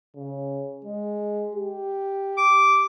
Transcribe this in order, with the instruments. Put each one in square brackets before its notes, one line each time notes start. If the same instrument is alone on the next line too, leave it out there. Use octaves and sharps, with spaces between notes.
[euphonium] C#3
G#3
G4
[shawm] D6